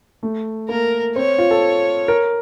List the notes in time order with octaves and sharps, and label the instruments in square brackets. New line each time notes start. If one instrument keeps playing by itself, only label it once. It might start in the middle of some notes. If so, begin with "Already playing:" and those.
[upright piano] A3
[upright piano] A#3 [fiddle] A#4
[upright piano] C4 [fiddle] C#5
[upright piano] F4
A4
A#4